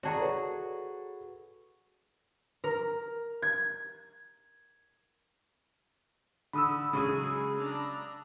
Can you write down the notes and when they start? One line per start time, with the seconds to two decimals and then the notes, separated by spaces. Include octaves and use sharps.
0.03 F#4 G#4 D5 A5 A#5
0.17 A4 B4 C#5
2.64 A#4
3.42 G#6
6.53 D3 B5 D#6 E6
6.93 C#3 F#3 G#3 G#4 C#6 D#7
7.58 D4 A#5